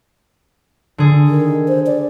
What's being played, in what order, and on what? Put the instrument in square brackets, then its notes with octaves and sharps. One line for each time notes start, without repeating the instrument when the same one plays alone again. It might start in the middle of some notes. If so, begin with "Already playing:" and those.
[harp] D3 G#4
[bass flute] D#3
C5
D5